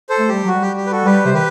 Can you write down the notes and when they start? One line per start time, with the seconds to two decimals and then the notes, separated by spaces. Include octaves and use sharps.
0.09 A4 C5
0.18 A3
0.29 G3 G4
0.44 F#3 F#4
0.55 G3
0.62 G4
0.76 G4
0.86 B4
0.91 F#4 A4
1.05 G3 G4 B4
1.25 C3 C5
1.34 D#3 G4 B4